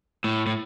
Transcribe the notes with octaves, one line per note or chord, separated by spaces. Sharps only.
A2
A2